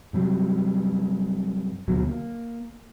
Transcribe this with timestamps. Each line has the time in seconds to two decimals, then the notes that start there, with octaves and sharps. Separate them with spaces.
0.13 G2 C3 F#3 G3
1.88 D2 B2 D3 F#3
2.07 A#3